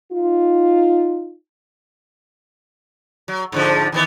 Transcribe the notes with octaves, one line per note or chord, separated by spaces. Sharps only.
D#4 F4
F#3
G#2 D3 F3
D#3 E3 B3